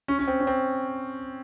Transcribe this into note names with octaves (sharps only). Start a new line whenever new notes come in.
C#4
C#4
C4
C#4
C4